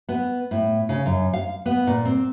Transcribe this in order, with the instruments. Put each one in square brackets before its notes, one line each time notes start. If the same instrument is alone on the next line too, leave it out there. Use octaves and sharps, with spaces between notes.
[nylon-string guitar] B3
A2
C#3
F#2
F5
B3
A#2
C4